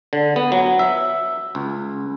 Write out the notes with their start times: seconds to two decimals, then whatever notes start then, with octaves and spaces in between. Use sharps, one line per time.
0.13 D3
0.36 B3
0.52 F#3
0.79 E5
1.55 C#2